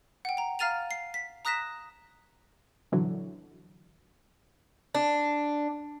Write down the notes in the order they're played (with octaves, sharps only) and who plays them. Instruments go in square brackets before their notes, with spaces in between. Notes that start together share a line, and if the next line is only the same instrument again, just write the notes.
[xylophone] F#5 G5
G5 A#5
F5 A#5 F6 A6 D#7 F7
C7
B6
A#5 D#6 F#6 A#6 B6 E7
[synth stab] A#1 D3 E3 F#3
[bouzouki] D4